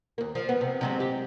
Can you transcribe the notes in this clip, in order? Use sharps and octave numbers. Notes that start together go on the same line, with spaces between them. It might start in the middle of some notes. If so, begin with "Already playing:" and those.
D#2 A#3
F3
B3
C3
C3 F#3 G#3
G4